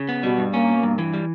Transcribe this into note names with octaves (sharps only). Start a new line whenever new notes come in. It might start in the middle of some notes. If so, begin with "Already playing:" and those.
Already playing: C#3
B3
B2 G3
G2
A#3 C#4
B2
G2
E3
G3